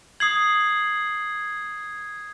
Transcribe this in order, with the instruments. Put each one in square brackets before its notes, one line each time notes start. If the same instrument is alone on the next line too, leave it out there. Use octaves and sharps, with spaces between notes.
[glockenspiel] D#6 C7 F#7 [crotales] G#6